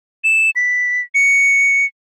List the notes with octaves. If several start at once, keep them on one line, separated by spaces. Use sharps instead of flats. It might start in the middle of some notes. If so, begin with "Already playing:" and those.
E7
B6
C#7